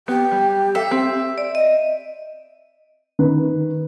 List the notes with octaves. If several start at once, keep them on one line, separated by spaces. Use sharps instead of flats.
B3 G4
G3
A4 E5 F5
C4
D5
D#5
D#3 B4